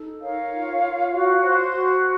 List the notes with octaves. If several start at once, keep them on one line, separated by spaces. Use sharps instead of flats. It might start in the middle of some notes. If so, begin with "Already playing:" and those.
Already playing: D#4 A4
A#4 C#5 F5
F4
F4
F#4
C5
F#4